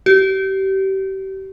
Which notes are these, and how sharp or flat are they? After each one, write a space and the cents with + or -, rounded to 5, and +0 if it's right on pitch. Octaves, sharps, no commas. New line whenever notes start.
G4 -30